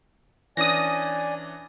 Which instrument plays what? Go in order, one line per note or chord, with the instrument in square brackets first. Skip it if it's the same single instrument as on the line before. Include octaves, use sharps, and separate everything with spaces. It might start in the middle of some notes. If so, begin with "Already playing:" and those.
[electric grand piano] E3 C#4 D4 [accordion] D5 G#5 [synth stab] D#6 A#6